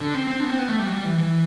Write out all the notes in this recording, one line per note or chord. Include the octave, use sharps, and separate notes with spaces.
D3
C4
C4
D4
B3
C4
B3
A3
G3
F#3
G3
E3
E3